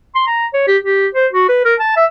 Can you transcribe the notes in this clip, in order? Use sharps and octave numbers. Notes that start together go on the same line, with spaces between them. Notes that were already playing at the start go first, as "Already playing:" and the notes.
C6
A#5
C#5
G4
G4
C5
F#4
B4
A#4
A5
E5